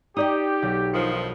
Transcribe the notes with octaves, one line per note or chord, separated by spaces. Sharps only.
D#4 G4 D5 D#5 D#6
B1
G2 D#3 F3 C#7